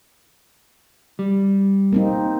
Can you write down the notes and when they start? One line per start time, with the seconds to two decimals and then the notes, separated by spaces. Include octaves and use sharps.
1.19 G3
1.93 A#3 C4 D#4